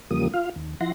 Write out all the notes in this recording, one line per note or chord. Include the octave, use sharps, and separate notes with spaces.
E2 C#3 F3 G3 A#3 D#6
F4 F5
D#2
F3 E4 F#5 C6 A#6